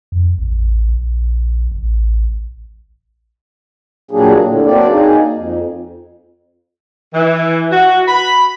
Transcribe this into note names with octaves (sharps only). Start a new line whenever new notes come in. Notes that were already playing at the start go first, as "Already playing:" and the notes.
F2
A1
A#1
A1
A#2 F#3 G3 A#3 D4 G#4
A2 D3
F#3 A#3 C4 D4 D5
A#3 D#4 G#4
F2
E3
F#4
B5